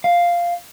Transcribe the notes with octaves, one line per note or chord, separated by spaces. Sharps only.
F5